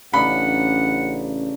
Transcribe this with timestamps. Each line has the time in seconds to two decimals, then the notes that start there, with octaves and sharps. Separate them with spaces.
0.14 A1 C#3 D4 D#4 F#5 B5